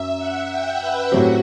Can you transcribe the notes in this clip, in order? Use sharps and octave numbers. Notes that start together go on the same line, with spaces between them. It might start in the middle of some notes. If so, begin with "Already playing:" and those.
Already playing: F#2 E5
F#5
G5
B4
A2 F#3 C4 F#4 G4